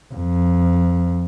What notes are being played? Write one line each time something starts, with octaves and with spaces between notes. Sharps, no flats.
F2